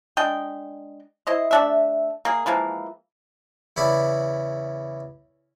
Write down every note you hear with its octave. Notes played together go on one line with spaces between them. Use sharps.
G#3 D4 D#5 G5
E4 C5 D#5
A3 D4 E5
A#3 G#4
E3 F3 G#3 A#3
E2 C#3 E4 D5 B5